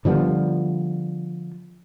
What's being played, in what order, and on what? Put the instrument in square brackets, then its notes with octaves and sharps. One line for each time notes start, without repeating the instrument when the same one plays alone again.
[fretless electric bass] D3 F3 G3 B3